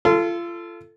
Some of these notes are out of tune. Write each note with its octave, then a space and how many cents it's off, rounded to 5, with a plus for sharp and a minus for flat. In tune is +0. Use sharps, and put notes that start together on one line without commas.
F4 -30 A4 +0